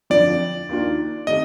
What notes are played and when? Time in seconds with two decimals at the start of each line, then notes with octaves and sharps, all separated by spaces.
0.10 F2 D3 F3 D5
0.69 D#2 D#3 A#3 D4 F4
1.27 D#3 A3 C4 G4 D#5